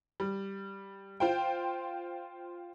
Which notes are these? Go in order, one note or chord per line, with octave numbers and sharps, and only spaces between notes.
G3
F4 C5 G5